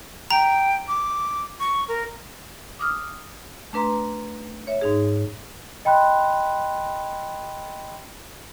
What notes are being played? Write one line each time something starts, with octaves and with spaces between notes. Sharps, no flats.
G5 A#5
D6
C#6
A#4
D6 D#6 F6
A3 D4 B4 A#5 C6
C#5 E5
G#2 D#4 G#4
D#5 G5 B5 C6 F#6